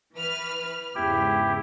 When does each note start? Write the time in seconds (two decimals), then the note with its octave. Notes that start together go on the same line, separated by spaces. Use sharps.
0.14 E3 B4 F6
0.95 E2 G#2 C#3 E4 G4